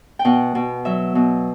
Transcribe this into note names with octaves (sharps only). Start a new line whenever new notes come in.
G5
B2 F#5
B2
F#3 E5
B2